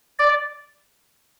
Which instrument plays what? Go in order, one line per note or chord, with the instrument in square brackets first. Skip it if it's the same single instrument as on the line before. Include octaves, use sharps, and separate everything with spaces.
[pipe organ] D5